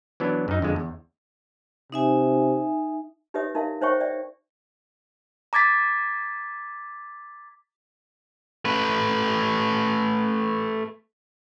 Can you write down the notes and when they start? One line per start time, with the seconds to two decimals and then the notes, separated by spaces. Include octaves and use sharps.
0.20 E3 F#3 B3 D4
0.48 F#2 D#4
0.62 F2 D3 G#3
0.76 E2
1.92 C3 D#4 E5 G#5
3.34 D#4 G4 B4 C#5 E5 D#6
3.55 D#4 E4 A#4 E5 F5
3.81 D#4 C5 C#5 E5 G5 C#6
4.00 D5 E5 G5
5.53 A#5 D6 G#6 A6 B6
8.65 A3 B4